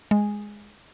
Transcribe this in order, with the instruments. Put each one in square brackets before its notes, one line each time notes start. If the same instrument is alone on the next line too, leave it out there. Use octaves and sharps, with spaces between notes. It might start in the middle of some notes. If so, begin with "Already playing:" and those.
[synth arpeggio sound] G#3